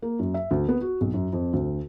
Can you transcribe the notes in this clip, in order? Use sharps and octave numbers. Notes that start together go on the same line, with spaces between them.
A#3
F#2
E5
D2
B3
F#4
B1
F#2
F2
D2